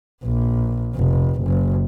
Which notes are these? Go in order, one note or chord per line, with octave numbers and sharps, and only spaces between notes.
A#1
F1
F#1